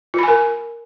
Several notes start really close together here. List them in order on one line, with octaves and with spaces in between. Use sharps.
F4 B5 G#5 A#4